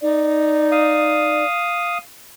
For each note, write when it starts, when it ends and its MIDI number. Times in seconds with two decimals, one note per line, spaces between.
0.02 1.43 63
0.02 1.46 74
0.72 1.98 77
0.72 1.98 87